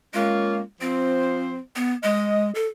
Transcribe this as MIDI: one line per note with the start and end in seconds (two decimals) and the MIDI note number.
0.14 0.60 56
0.14 0.60 58
0.14 0.60 61
0.14 0.60 65
0.81 1.57 53
0.81 1.58 60
0.81 1.57 72
1.76 1.93 59
2.03 2.51 56
2.03 2.50 75
2.55 2.66 69